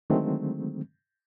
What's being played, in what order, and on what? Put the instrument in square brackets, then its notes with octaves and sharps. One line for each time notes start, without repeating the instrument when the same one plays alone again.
[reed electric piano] D3 D#3 F#3 G#3 A3 C4